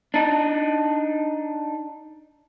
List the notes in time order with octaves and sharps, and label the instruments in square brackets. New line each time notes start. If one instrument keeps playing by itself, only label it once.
[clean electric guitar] D4 D#4